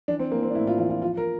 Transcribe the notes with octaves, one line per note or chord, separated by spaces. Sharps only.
E3 D4
C4
E3 A#3
C4
D4
A2 E4
F4
E3 F4
F4
F3 F4
A#4